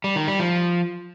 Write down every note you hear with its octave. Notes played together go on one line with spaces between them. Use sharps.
G3
D#3
G3
F3